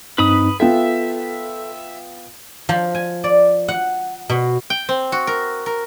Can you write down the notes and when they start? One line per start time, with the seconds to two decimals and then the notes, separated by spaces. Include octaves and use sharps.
0.18 G2 C4 D#4 B4 B5 D#6
0.60 B3 F4 A4 E5 G5
2.69 F3
2.95 G#5
3.24 D5
3.68 F#5
4.29 B2
4.70 G5
4.89 C4
5.12 F#4
5.27 A#4
5.66 A#4